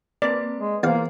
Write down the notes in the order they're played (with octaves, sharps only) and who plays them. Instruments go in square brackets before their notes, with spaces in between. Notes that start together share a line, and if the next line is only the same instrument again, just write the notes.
[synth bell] A#3 C4 B4 [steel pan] D5
[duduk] G#3
[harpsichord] E2 F5 [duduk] A#3 [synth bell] G#4 C5